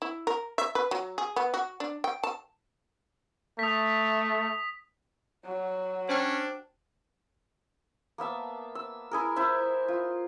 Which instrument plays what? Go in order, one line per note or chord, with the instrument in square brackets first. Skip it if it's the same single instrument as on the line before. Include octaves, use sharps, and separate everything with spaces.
[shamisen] E4
A#4
E5
B4
F#3
G#4
B3
F#4
D4
G5
A5
[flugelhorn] A3 [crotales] D#6 B6
[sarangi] F#3
[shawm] C#4 [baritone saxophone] D4 [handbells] C5 G5
[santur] A#3 B3 E5 A5
E6
E4 G#4 A#4
E4 C5 E5
F4